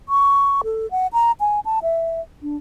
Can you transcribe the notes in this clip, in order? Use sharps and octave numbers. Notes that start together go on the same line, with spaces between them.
C#6
A4
F#5
A#5
G#5
A5
E5
D4